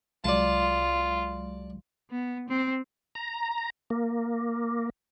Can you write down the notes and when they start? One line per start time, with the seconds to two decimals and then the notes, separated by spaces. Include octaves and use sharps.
0.24 C2 F#3 G#3 F4 D5 A5
2.11 B3
2.49 C4
3.15 A#5
3.90 A#3